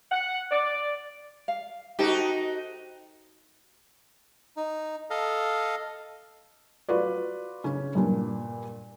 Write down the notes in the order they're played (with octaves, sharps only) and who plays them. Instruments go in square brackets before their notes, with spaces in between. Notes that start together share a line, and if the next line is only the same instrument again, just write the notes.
[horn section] F#5
D5
[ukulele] F5
[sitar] D#4 F#4 [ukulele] G4 A4 C5
[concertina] D#4
A4 D#5 F5
[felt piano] F4 F#4 B4 D5
C#3 C#4
G2 A#2 D4